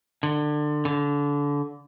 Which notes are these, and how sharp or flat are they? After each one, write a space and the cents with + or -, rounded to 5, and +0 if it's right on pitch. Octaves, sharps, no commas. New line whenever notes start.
D3 +25
D3 -25